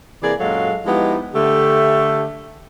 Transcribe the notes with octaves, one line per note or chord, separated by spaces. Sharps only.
C3 E3 A#3 G#4 D5
F#2 A#2 F#3 G#3 A4 F5
F3 G#3 B3 D#4 E4 G4
D3 A3 G4